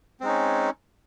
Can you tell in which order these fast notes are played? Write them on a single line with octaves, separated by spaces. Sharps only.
C4 G#3 D#4 C#4